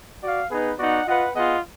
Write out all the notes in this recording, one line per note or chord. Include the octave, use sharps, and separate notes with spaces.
F#4 D5 F5
B3 D#4 G#4 B4
B3 D#4 F#4 D5 F#5
F4 B4 D#5 F#5
B3 F4 G#4 D#5 F#5